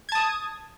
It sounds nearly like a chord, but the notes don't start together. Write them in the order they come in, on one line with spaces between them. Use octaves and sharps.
G#6 A5 D#6